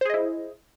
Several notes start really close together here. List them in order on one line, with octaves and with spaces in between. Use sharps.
C5 G#4 D#5 E4